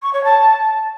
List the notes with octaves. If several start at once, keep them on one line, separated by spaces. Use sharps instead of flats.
C#6
C#5
A5